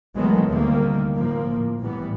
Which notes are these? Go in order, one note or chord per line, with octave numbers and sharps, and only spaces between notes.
D#3 E3 F#3 G#3 A3 B3
D2 C3 D#3 G3 A#3
A2 F3 A#3
A2 E3 G3 B3